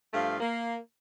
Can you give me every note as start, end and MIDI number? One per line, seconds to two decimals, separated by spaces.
0.14 0.37 43
0.14 0.37 53
0.14 0.37 57
0.14 0.37 77
0.41 0.76 58